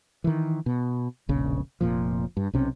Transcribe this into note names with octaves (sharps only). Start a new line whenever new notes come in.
D#3 E3
B2
E1 A#1 C#3
F1 A#2 F3
G2
B1 C3 C#4